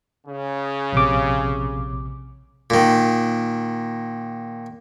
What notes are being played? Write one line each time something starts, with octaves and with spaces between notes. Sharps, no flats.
C#3
A#1 C3 D6
A#2 D#3